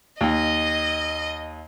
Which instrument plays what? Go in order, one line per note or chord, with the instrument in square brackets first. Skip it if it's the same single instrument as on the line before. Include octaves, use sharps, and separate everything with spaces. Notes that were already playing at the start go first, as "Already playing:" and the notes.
[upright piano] D#2 [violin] D#5